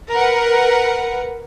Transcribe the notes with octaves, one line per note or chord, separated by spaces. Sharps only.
A#4 B4 F#5